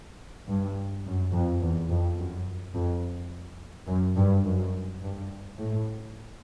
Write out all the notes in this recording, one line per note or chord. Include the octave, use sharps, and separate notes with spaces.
G2
F#2
F2
E2
F2
F#2
F2
F#2
G2
F#2
G2
A2